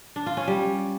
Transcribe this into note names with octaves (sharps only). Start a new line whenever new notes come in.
D4
F4
C#4
G3